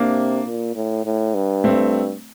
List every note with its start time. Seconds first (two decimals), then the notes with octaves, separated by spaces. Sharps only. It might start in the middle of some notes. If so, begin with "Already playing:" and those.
Already playing: C3 A#3 D4
0.47 A#2
0.76 A2
1.05 A2
1.35 G2
1.64 A3 C4